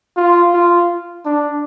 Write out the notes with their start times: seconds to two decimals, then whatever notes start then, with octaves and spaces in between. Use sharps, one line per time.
0.17 F4
0.53 F4
1.25 D4